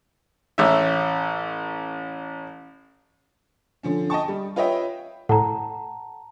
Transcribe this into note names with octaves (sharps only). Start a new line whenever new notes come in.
A1 C#4 E5
D3 F3 C#4
D#5 G5 A5 C#6
G3
F4 B4 C#5 D#5 E5 G5
A2 F#5 A5 A#5